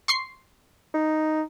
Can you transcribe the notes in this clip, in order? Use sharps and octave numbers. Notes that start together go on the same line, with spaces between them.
C6 C#6 C7
D#4